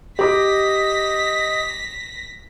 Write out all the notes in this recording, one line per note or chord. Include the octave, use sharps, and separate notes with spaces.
G4 D#5 D6 D#6 A#6 B6